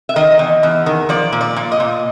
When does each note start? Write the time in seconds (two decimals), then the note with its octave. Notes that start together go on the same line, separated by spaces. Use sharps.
0.09 E5
0.16 D#3 D#5
0.39 E2
0.63 E2
0.86 D#3
1.09 F3 D5
1.33 A#2
1.41 D5
1.56 A#2
1.72 D#5
1.80 A#2